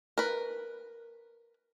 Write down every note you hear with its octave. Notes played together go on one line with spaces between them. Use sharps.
A#4 B4